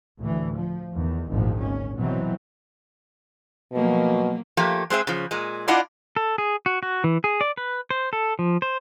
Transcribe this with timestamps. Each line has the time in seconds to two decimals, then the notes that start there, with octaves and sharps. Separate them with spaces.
0.19 D2 A2 E3
0.57 F3
0.94 E2 D#3
1.31 G#1 D2 A#2 F3
1.61 C#4
1.97 B2 E3 F#3 C4
3.73 B2 F3 F#3 A#3
4.57 F3 A3 A#3 G4
4.90 G#3 C4 G#4 E5
5.07 C#3 F3
5.31 A#2 G#3
5.68 D4 E4 F4 D5 D#5 F#5
6.16 A4
6.38 G#4
6.66 F#4
6.83 F#4
7.04 E3
7.24 G#4
7.41 D5
7.57 B4
7.90 C5
8.13 A4
8.39 F3
8.62 C5